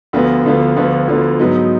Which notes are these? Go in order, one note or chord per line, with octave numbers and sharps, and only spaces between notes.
D2 D3 F3 B3 F4
D2 D3 F3 B3 F4
D2 D3 F3 B3 F4
D2 D3 F3 B3 F4
G#2 F#3 B3 D#4